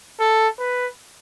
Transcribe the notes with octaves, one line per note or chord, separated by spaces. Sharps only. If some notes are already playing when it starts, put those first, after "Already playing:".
A4
B4